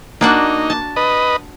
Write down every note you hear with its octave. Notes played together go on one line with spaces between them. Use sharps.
A#3 D4 D#4 F#4
A5
B4 D#5